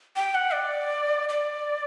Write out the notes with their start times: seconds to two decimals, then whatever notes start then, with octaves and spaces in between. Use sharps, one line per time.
0.16 G5
0.35 F#5
0.53 D5
1.29 D5